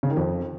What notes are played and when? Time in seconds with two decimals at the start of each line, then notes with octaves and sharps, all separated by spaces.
0.03 C#3
0.10 D#3
0.17 F2